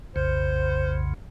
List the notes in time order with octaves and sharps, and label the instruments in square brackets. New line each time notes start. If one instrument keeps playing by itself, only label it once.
[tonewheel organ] B1 F2 C#3 [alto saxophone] C5